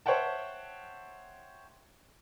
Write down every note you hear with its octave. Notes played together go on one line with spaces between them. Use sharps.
C5 C#5 E5 F#5 G5 A5